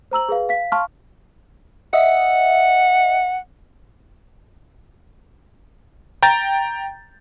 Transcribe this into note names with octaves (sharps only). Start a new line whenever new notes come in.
C5 A#5 E6 F#7
G#4 B4 F5
F5 B6
F5 A5 C6 C#6 F6
D#5 E5 F#5
G5 A#5 G6 A6